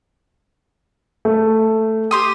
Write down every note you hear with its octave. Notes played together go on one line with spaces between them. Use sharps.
A3
G4 C6 D#6